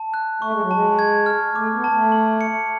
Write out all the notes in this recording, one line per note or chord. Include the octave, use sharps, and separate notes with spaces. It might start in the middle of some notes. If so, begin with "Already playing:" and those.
Already playing: A5
F#6
A3 C#6
G#3
F#3
G#3 A5
G#6
F6
A3 D6
B3
A5
A3
F#7
C#7